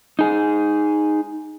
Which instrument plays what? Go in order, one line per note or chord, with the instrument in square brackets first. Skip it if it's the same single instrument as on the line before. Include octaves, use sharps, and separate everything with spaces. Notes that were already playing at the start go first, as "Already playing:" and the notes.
[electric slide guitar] D#4 G#4